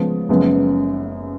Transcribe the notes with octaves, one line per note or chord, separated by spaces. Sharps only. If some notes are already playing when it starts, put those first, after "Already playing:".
Already playing: C#3 F3 G#3 B3
F#1 F#2 F3 G#3 B3